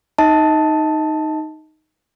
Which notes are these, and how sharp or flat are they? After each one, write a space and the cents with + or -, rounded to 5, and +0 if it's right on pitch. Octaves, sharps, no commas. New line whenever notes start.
D#4 +0 D#5 +40 A5 +0